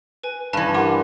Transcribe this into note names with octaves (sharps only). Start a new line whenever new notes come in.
B4 G#5
G2 E3 A5
G4 A#4 F#5 C6 D6